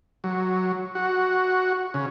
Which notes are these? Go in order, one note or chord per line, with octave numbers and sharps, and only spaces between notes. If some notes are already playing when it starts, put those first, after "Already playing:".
F#3
F#4
C#3